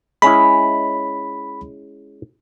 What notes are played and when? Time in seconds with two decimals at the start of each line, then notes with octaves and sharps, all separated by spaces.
0.22 G#3 C#4 E4 B5